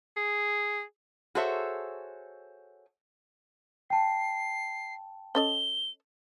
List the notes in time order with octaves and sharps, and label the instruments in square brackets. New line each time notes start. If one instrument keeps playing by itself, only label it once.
[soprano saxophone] G#4
[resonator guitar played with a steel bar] F#4 G#4 A4 C5 C#5 E5
[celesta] G5 A5 [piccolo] C7
[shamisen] C#4 A4 D#5 [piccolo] G7